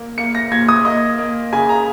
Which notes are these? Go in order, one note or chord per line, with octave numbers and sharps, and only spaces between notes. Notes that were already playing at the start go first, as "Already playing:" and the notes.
Already playing: A#2 A#3
A#3 C#7
A#6
A#2 G#6
D#6
A#3 D#5
A#3
C#3 G#5
A#5